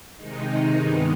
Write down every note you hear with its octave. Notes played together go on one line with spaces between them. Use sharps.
C3 D#3 G#3 D#4
G2 D#3 G#3 B3 D#4